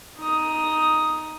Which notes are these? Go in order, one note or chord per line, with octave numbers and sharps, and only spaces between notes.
D#4 D#6